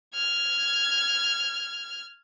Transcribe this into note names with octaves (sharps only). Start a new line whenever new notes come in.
F6 G#6